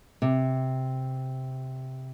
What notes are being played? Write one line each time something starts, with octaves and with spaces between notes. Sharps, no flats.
C3